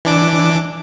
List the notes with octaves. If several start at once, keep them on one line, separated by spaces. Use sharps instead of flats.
E3 D4 D6